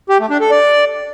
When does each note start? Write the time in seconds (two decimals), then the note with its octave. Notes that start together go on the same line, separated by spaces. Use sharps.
0.09 G4
0.20 A3
0.30 D4
0.41 A4
0.51 D5